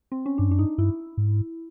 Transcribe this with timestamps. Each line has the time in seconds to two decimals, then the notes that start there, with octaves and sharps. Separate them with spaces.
0.12 C4
0.26 C#4
0.38 G2 D4
0.49 F#2 D4
0.59 G2 D#4
0.78 G2 E4
1.17 G#2